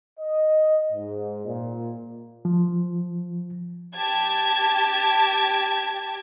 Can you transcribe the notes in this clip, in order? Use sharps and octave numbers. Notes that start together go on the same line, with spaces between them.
D#5
G#2
A#2
F3
G4 A5 G#6